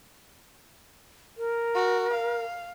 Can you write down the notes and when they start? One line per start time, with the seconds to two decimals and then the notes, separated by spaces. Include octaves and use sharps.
1.37 A#4
1.75 F#4
2.14 F5